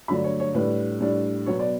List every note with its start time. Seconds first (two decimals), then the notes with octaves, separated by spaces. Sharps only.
0.08 G2 D3 F#3 A3 D4 B5
0.24 C#5
0.40 C#5
0.55 A2 G3 D4 B4
1.01 A2 G3 D4
1.46 B2 F#3 B3 C#5
1.59 D5